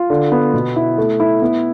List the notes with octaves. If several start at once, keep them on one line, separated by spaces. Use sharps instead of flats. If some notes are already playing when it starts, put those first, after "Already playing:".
Already playing: F4
D3
B3
B2
E4
A3
E4
B3